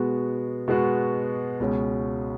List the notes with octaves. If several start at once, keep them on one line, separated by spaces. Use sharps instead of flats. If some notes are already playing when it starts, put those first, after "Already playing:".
Already playing: B2 G#3 B3 F#4
B2 G#3 B3 F#4
C#2 B2 G#3 C#4